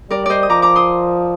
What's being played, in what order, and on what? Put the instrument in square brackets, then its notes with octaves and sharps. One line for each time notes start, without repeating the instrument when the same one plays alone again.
[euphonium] G3 [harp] A#4 D5
[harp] C5 D5 D#5
D#6
[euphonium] F3 [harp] A#5 D6
[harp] A#5 D6
C6 D#6